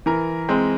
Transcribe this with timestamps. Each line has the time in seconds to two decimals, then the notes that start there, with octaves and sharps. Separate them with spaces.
0.06 E3 A#4
0.49 G#3 C4